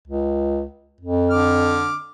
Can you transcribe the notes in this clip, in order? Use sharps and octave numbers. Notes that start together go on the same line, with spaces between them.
C#2
F2
D3 D6 F6